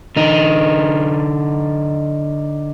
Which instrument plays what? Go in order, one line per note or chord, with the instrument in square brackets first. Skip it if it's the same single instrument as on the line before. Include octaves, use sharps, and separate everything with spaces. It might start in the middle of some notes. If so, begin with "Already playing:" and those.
[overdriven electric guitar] D3 D#4